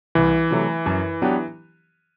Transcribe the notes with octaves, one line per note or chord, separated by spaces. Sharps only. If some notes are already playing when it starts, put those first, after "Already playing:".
C2 E3
C3 F#3 A3
F#2
F#3 B3 D4 G4